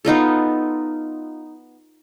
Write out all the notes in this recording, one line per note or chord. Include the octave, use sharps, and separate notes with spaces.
B3 D#4 F4 A4